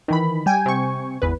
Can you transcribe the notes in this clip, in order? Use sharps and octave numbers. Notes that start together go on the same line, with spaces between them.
D#3 E3 B5
G3 G5 G#5
C3 C#6
G#1 E2 B4